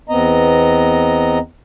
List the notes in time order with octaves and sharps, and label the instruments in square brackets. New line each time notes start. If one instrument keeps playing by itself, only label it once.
[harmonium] E2 B3 C4 D#5 A#5